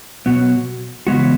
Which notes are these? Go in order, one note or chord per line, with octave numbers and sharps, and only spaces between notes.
B2 F#3 B3 F#4
C#3 E3 G#3 B3 F#4